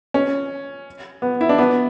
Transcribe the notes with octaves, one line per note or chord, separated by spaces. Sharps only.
C#4
B3
E4
D4
B3